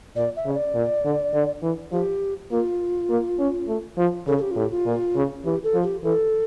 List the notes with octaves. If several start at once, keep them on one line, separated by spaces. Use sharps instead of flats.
A#2 D5
E5
C#3
C#5
D5
A#2
D3
D3
E3
F3 G4
A#3 F4
A#3
C#4
A3
F3
C#3 A4
A4
G4
F4
A2 G4
F4
A#2
C#3
E3 G4
A4
F3
G4
E3 A4